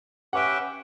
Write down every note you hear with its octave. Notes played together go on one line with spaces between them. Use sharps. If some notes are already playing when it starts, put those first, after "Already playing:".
C#4 G4 B4 E5 F#5 G5